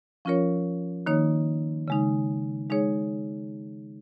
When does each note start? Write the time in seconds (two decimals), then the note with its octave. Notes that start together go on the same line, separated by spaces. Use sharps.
0.25 F3 C#4 F4 A#4 C#5
1.06 D#3 A#3 D#4 C#5
1.88 C#3 G#3 D#4
2.70 G#3 D#4 G#4 C#5